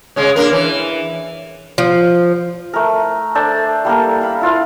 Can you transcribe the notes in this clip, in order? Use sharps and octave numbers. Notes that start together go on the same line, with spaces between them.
C#3 G#3 C#4
A#3 D4 A#4
E3
F3
A3 A#4
D4 A4 C5 D5
G3 A#3 A4 A#4
F5 B5
E4 F4 B4 F5